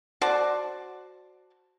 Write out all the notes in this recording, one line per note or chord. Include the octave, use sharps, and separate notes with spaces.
F#4 C5 D5 A5